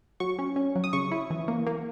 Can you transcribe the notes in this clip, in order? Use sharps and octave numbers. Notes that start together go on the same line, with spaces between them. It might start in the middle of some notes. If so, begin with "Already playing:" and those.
F#3 C#6
C#4
C#4
F#3
D#6
C#3 C#6
E4
E3
A#3
A#3